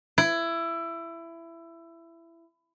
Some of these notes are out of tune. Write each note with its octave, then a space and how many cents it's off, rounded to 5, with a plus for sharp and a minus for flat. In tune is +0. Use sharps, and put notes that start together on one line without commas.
E4 +20